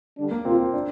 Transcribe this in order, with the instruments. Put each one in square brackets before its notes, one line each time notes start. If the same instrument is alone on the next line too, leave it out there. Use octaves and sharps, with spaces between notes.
[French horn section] D3 G3 D4
[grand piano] A#3
[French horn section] D2 C3 A#3 F4 [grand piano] C4
[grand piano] D4